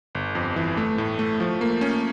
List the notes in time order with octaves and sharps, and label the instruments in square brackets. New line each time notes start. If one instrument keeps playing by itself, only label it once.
[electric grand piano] G1
F2
E3
A3
A2
A3
F3
A#3
C#4